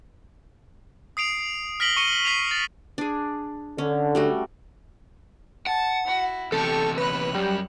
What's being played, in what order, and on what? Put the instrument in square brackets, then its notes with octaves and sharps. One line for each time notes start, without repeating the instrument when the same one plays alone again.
[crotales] D#6 C7 D7 F7
F6 A#6 B6 D7 F#7 G7
C#6 C#7 D#7 G7
B6 C7 F7
A6
[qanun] D4 G#4
[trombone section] D3 [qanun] C#4
[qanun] G3 A3 F#4
[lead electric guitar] F#5 [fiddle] A5
[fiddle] E4 F#4
[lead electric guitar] E2 C3 [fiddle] G4 C#6 [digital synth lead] A4
[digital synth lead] B4 [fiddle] C#5 F#6
[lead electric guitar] F#2 [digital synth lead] G3